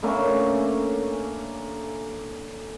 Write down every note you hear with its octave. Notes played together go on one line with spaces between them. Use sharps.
D3 A3 A#3 C#4